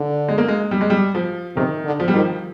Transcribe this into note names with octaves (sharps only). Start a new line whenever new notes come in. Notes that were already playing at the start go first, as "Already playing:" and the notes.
Already playing: D3
G#3
A#3
G#3
G3
G#3
G3
F3
C3 D#3
D3
F3
G3
D#3 F3